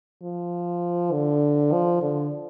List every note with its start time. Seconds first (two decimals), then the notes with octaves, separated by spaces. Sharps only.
0.23 F3
1.12 D3
1.72 F3
2.02 D3